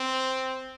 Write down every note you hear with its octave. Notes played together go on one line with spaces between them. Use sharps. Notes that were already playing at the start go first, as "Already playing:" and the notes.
Already playing: C4